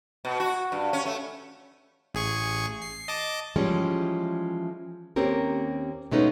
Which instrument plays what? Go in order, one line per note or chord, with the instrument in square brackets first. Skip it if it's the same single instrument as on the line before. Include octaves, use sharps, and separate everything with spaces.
[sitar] B2
F#4
G2
C#4
A3
[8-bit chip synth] A1 G#4 C#6
C7
D#5 A5 D6
[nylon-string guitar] E3 F3 G3 G#3 C#4
D#2 A#3 C4 C#4 G4 A#4
B2 G#3 A3 B3 C#4 D#4